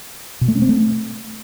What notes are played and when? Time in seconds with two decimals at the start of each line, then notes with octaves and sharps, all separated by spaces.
0.41 B2
0.48 A3
0.55 C#4
0.62 C4
0.69 A3